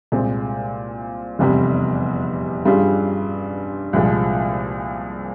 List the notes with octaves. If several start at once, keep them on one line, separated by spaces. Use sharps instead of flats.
C2 A#2 G#3 C4
F1 E2 C3 G3
G2 G3 C#4 F4 G#4
C2 A#2 F3 G#3